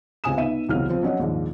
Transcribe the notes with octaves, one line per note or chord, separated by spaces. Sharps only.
C#2 C3 G#5 D#6 E7
B3 D#4 E5 D#7
E1 C#2 C3 E3 F#3 F6
F3 C4
F#3 C#4 D#5 F#5
A#1 D#2 G#2